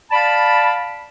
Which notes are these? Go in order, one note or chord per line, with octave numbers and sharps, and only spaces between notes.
D5 F5 A5 B5